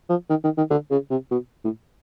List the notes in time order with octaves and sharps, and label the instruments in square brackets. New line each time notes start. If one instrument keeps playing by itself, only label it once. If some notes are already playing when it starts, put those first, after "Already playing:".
[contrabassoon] F3
D#3
D#3
D#3
D3
C#3
C3
B2
A2